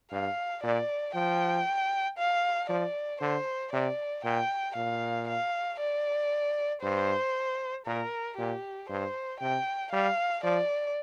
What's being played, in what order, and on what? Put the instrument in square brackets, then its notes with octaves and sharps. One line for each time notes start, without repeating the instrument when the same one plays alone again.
[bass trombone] G2 [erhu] F5
[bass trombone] A#2 [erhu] D5
[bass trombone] F3 [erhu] G5
[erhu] F5
[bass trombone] F3 [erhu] D5
[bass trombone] D3 [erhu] C5
[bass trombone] C3 [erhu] D5
[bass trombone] A#2 [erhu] G5
[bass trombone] A#2 [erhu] F5
[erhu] F5
D5
[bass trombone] G2 [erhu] C5
[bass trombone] A#2 [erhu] A#4
[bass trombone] A#2 [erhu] G4
[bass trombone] G2 [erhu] C5
[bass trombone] C3 [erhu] G5
[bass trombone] G3 [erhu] F5
[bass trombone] F3 [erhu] D5